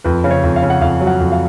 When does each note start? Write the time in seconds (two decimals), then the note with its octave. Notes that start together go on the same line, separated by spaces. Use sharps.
0.04 F2 B4
0.24 C#3
0.31 C#5
0.44 F2
0.56 F5
0.62 C#3
0.70 F#5
0.81 F2 F5
1.01 F#3
1.07 F#5
1.20 F2
1.32 F5